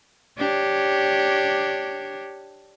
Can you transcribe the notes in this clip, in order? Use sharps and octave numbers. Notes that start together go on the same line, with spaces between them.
D4 G4 C#5